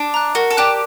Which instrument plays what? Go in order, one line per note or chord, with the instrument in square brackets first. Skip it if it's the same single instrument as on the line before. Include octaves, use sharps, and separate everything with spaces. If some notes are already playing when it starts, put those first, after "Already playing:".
Already playing: [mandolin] D4
[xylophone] A#5 F#6
[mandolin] F#4 [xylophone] A#4
[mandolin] A4
[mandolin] G4 [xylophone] D5 A5 D6 F#6